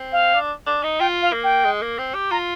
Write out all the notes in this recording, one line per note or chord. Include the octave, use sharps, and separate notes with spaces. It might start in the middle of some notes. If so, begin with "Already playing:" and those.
Already playing: C4
F5
D4
D4
D#4
F4 G5
F5
A#3
G5
G#3
A#3
C4
G4
F4 A#5